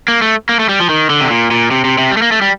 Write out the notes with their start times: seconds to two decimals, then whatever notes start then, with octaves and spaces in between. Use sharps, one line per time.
0.08 A#3
0.22 A3
0.49 A#3
0.59 A3
0.69 G3
0.80 F3
0.90 D#3
1.10 D3
1.20 C3
1.30 A#2
1.51 A#2
1.71 C3
1.85 C3
1.98 C3
2.11 G3
2.17 A3
2.22 A#3
2.32 A3
2.42 G3